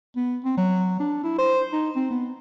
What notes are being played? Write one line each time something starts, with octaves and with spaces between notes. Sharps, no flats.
B3
C4
F#3
D4
E4
C5
D#4
C4
B3